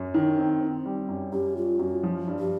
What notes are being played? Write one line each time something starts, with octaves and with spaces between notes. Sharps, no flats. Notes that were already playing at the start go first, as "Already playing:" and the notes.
Already playing: F#2
D#3
C4
C4
G3
F#2
F#2 G4
G3 F4
F#2 F#4
F3
G2
G4